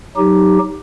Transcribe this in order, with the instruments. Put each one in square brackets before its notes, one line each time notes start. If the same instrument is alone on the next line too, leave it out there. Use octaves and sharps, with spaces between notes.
[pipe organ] F#3 D#4 G4